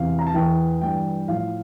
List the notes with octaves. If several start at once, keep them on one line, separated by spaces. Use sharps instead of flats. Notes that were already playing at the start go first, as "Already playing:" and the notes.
Already playing: E2 C3 E3 F5
A#5
A5
E2 E3 G5
G2 E3 G5
A2 F3 F5